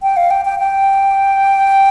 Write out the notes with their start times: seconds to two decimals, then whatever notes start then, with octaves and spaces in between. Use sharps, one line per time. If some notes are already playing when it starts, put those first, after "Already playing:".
0.03 G5
0.17 F5
0.31 G5
0.45 G5
0.59 G5